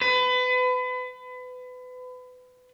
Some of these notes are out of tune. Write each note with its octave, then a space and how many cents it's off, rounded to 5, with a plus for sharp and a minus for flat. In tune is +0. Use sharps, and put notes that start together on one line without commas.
B4 +30